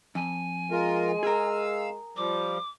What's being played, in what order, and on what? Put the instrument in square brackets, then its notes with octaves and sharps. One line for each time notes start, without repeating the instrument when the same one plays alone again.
[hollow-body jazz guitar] F2 [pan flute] G#5
[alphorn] G#3 [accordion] F4 A#4
[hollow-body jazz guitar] G#4 A#4 [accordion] F5 E6
[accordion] F3 G3 [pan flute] D6